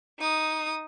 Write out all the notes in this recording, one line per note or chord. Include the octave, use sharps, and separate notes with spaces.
D#4 D#6